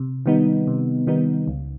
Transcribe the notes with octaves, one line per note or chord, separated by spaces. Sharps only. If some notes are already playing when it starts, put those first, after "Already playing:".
Already playing: C3
D#3 G3 B3 D#4
C3
D#3 G3 B3 D#4
C#2